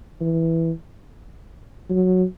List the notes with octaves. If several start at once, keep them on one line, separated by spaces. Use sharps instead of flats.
E3
F#3